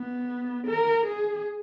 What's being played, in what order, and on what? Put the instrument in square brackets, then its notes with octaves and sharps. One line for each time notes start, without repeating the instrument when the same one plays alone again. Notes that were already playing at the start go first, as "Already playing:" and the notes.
Already playing: [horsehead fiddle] B3
A#4
G#4